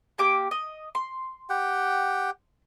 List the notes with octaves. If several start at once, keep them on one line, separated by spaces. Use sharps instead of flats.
A#3 G4 D6
D#5
C6
G4 F#5 G5